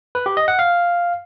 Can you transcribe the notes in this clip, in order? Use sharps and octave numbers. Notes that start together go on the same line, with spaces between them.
B4
G4
D#5
F#5
F5